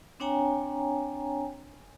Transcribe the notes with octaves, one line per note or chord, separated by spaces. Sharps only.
C4 D4 C#5 G5 G#5 A#5